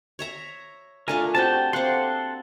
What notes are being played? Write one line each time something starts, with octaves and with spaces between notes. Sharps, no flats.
C#5 E5 A#5
A3 D4 F4 A#4 G#5
C4 F#4 G4 G5 A5
A#3 C4 A4 F#5 C6